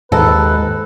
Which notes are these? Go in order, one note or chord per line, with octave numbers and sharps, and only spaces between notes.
D#2 G#2 A4 B4